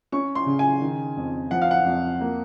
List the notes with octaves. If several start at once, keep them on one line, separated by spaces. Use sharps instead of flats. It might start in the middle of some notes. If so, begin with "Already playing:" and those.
C#4 C#6
C6
C#3
G#5
D#3
F2
F3 F#5
F5
F#5
F2
A#3